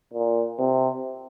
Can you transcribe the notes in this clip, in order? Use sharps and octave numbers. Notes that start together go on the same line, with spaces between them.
A#2
C3